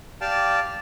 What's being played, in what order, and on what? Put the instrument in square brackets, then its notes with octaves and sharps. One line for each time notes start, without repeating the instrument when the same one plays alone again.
[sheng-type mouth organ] G4 D5 F5 G5 A5